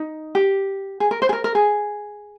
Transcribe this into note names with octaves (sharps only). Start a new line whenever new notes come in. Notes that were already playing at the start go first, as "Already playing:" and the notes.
Already playing: D#4
G4
G#4
A#4
C5
G#4
A#4
A#4
G#4